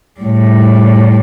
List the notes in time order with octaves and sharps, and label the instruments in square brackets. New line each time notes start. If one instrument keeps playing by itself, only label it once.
[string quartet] A2 G3